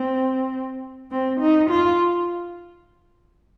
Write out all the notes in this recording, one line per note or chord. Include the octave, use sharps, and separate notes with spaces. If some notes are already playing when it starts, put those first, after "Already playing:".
Already playing: C4
C4
D#4
F4